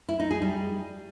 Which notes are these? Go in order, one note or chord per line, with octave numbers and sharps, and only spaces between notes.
E4
D#4
G#4
G3